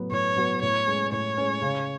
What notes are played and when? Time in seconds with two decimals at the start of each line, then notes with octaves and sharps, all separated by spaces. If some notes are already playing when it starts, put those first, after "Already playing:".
Already playing: A2 F#3 B3 F#4 B4
0.12 A2 C#5
0.36 F#3 B3 F#4 B4
0.61 A2 C#5
0.87 G#3 C#4
1.12 A2 C#5
1.37 G#3 C#4
1.62 C#3